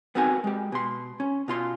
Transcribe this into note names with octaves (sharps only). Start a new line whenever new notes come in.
B3 C4 D#4 F#4 A#4 G#5
G#3 G4
B2 C6
C#4
B2 F4 C6